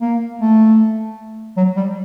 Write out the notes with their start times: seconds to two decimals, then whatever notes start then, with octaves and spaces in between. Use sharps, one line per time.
0.01 A#3
0.41 A3
1.57 F#3
1.76 G3